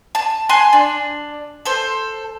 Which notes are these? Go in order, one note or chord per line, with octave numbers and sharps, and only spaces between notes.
A5
G#5 A5 C6 F#6
D4
A4 C5